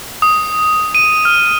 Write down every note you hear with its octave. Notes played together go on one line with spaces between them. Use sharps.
D#6
D#7
F6